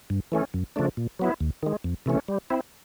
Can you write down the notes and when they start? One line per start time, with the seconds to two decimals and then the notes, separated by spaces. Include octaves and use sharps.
0.10 G2
0.32 E3 A3 C#4
0.54 F#2
0.76 C#3 F3 A3 D4
0.97 A#2
1.19 F#3 B3 E4
1.41 D#2
1.63 D#3 G#3
1.84 F2
2.06 C3 E3 A3 C#4
2.28 G3
2.50 C4 E4